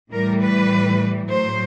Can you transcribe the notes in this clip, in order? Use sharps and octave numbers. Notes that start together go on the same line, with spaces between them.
A2 E3 G3 A#4
B4
A2 F#3 C5